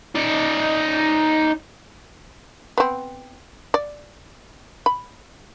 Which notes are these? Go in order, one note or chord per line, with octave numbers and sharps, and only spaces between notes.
D#4 D5
B3 C4
D5
B5